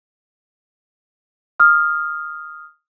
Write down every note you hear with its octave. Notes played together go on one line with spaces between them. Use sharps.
D#6 F6